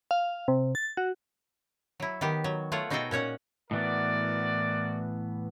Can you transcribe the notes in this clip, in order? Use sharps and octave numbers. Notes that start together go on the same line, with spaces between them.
F5
C3
A6
F#4
F#3 E4
D#3 B3 G4
F#3
A3 F4 C#5 F#5
B2 D#4 F#4 G#4 A4 G5
A#2 C#4 C#5 F#5
A2 E3 B3 F#4 A#4 D5